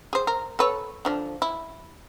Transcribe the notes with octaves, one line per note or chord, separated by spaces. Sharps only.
G#4 C5
A#4
A4 B4 C#5
D3 F3 D4
E4